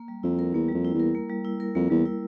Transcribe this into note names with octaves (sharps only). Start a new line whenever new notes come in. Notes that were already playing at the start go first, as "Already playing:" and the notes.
Already playing: A#3
G3
F2 E4
A#4
E2 A#3
G3
F2
E4
E2
A#4
A#3
G3
E4
A#4
F2 A#3
E2 G3
E4